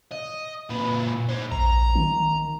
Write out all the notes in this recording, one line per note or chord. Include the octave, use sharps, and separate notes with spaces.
D#5
A#2 B4
G#4 C5
A#1 A#5
D#3